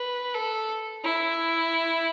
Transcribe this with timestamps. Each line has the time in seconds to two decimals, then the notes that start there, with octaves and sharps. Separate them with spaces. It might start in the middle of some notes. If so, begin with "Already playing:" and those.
Already playing: B4
0.34 A4
1.04 E4